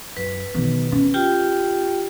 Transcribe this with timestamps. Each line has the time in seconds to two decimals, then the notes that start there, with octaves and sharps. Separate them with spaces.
0.17 F#2 B4
0.55 B1 D#3
0.92 C4 C#4
1.14 F4 G4 G5